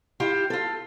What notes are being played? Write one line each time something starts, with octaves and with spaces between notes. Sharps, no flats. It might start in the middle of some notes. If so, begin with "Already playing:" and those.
E4 F4 G4
F4 A4